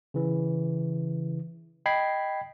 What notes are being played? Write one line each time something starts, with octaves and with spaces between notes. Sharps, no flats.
C#3 E3
D#5 G5 B5 G#6 C7